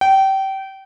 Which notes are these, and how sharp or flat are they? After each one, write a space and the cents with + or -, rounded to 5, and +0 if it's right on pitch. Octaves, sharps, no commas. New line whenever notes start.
G5 -25